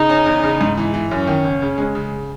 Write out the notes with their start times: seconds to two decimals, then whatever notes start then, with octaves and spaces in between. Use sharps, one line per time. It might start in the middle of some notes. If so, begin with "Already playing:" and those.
Already playing: C#3 D#4
0.09 C#4
0.26 E2
0.43 C#3
0.61 G#2
0.77 E3
0.94 E3
1.10 F#2 C#4
1.27 D#3
1.44 F#1
1.62 C#3
1.78 G#3
1.95 C#3